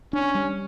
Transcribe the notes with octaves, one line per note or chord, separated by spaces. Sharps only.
C#4 D4
G3